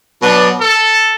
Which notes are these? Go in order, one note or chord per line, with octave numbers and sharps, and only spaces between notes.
B2 F#3 B3 D4
A4